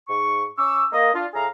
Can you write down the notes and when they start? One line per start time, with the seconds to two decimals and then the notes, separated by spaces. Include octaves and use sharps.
0.08 G#2 C#6
0.57 C#4 C#6 D6 E6
0.92 A#3 D#5
1.14 D4 F4
1.34 A2 G#4 E5 F5 A#5